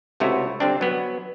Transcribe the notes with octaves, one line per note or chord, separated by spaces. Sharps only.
C#2 C3 A3 E4 F#4 C#5
D3 G3 C4 D4
F#3 B3